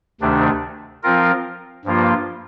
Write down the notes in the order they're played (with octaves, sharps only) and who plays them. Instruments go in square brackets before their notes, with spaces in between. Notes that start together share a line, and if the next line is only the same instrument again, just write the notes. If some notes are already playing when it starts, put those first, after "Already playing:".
[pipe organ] D2 C3 D#3 A3 D4
F3 C4 F4 A#4
G2 F3 A#3 F4